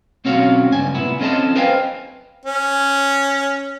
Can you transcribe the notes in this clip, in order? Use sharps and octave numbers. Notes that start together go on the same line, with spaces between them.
B1 C4 C#4 F#4 C#5 F5
C#2 G2 G#5
C2 A#2 B3 E4
C4 C#4 A4 D#5 A5
B4 C5 D#5 F5 G5 G#5
C#4